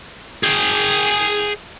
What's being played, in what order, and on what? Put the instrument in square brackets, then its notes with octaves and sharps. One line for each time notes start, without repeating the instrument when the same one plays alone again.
[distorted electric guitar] G#4 G5